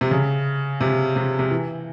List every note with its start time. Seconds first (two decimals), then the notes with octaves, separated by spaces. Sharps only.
0.01 C3
0.11 C#3
0.81 C3
1.16 C3
1.39 C3
1.50 E3